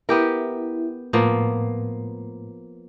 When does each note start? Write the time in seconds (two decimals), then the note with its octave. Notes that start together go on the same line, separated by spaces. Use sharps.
0.09 B3 E4 G4 A#4
1.13 A2 F3 A#3 B3